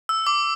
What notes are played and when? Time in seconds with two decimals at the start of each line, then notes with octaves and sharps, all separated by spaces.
0.09 E6
0.27 D6